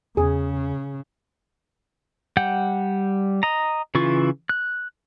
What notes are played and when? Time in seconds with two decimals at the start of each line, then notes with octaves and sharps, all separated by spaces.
0.17 E2 C#3 G#4
2.37 G3 F#5 G5 G6
3.43 D#5 A#5
3.95 C#3 E3 E4 F4 C#6
4.49 F#6